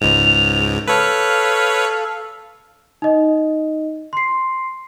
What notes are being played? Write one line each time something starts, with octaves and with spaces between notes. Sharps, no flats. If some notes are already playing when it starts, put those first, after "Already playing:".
C#2 G#2 F7
A4 B4 C#5 F5
D#4 D#5
C6 C7